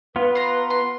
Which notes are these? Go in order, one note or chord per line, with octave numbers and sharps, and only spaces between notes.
B3 F4 B4
A#5 C6
C6